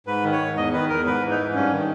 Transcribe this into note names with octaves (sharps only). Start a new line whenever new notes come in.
G#2 B4
D#3
C#5
G#2
E2 D#5
D#3 B4
E2 A#4
G#2 B4
E3
D#4
G#2
G2 C#4
D#3